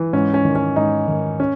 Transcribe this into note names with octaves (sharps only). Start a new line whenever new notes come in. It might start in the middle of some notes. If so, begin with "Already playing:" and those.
Already playing: E3
G#2 C#4
C#4
D#3
C#4
G#2 D#4
D#3
C#4